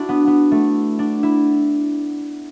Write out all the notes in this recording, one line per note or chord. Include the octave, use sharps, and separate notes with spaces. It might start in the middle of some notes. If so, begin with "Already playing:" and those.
Already playing: D4 E4 F#4
B3
B3
A3
D4
E4